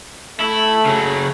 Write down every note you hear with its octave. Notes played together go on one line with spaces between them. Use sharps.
A3 E4
C#3 F#3